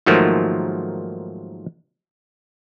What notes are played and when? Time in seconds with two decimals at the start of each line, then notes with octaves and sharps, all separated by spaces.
0.06 G#2 D#3 F3 F#3 A3 A#3